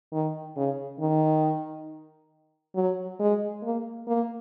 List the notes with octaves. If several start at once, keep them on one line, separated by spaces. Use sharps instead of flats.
D#3
C#3
D#3
F#3
G#3
A#3
A#3